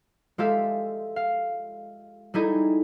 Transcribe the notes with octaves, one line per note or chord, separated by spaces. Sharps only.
G#3 F4 G4 A4 E5 F5
F5
G3 D#4 E4 G#4 A4 D#5